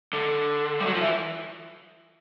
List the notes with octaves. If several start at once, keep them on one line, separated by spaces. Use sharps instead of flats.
D3
G3
F#3
F3
E3